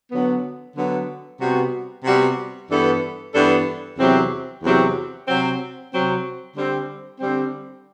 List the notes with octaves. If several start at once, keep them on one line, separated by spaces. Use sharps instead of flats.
D3 F#3 B3
D3 F#3 B3
C3 G3 B3 F#4
C3 G3 B3 F#4
G2 E3 B3 D4 A4
G2 E3 B3 D4 A4
E2 C3 F#3 C4
E2 C3 F#3 C4
C3 F#3 C4
C3 F#3 C4
D3 G3 C4
D3 G3 C4